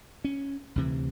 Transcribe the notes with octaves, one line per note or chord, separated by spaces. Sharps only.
C#4
D2 C3 E3